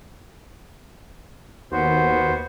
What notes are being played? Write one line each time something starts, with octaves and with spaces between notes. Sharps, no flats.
D#2 B3 F#4 C5